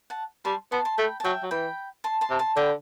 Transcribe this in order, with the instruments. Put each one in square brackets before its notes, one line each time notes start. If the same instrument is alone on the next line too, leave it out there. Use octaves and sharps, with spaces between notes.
[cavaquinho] F#5 A5
[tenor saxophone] G3 [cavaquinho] A5 C6
[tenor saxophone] B3 [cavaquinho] A5 C6
[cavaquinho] A5 C6
[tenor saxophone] A3 [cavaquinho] G5 B5
[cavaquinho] A5
[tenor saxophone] F#3 [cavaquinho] E5 G5
[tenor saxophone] F#3
[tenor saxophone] E3 [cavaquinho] G5 B5
[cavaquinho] A5 C6
A5 C6
[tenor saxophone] C3
[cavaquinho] A5 C6
[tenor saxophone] D3 [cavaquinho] G5 B5